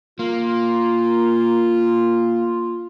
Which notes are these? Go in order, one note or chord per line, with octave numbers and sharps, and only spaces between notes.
A#3 F4